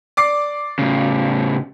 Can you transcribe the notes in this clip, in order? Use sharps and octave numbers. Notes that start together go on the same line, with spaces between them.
D5 D6 C7
A2 C#3